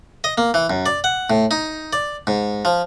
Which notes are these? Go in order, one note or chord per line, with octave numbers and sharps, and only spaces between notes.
D#5
A#3
E3
F#2
D5
F#5
A2
D#4
D5
G#2
F3